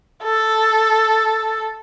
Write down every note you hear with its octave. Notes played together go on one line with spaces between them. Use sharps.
A4